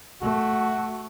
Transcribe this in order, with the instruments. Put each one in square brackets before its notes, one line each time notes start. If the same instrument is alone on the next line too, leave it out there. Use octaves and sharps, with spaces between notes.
[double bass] A3 [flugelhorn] F#4